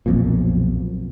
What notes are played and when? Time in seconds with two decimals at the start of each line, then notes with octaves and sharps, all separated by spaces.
0.06 B1 F2 A#2